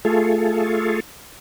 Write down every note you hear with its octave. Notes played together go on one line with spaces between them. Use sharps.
A3 F4 G#4 A4